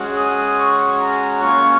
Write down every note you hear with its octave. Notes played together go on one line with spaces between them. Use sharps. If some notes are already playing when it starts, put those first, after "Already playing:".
Already playing: G#3 C#4 F#4
D#6
C#6
A#5
A#3 C#4 F4 C#6